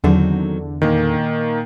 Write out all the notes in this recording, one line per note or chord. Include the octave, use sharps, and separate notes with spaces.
E2 D3 D#3 F#3 C4
A#2 D#3 A#3 A#4